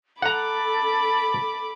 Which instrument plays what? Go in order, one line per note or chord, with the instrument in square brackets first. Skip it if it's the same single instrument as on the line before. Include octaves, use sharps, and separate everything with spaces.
[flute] A4 [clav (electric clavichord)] F#5 A#5 [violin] B5 D6